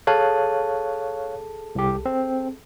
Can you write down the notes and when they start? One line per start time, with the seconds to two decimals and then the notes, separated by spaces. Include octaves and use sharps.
0.07 G#4 A4 C#5 F5 A5 F#6
1.75 C2 G4
2.06 C4